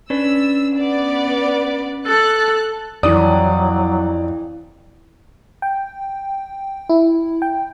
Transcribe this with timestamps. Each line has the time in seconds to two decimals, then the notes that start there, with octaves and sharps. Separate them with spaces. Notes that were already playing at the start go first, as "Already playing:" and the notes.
0.10 C#4 D4 B4 E6
0.78 B3 D5
2.07 A4 F#6
3.03 F2 E3 F#3 D5 D#6
5.62 G5
6.89 E4
7.42 G5